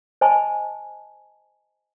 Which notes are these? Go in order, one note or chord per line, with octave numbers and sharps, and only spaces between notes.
C5 D#5 G#5 A5 B5